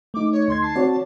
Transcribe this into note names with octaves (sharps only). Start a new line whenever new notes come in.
A3 D#4 D6
C#5
D2 C6 G#6
A5 C7
C4 F#4 C#5 D5